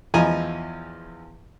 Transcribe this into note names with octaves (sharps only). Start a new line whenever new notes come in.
E2 F3 E4 D#5 G#5 A#5